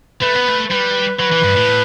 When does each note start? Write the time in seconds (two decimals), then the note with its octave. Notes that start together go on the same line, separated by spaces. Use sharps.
0.22 A3 B4
0.36 B3
0.49 A3
0.71 G3 B4
1.20 F#3 B4
1.32 E3
1.44 G2
1.56 A2